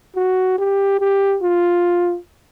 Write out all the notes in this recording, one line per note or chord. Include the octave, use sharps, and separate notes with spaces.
F#4
G4
G4
F4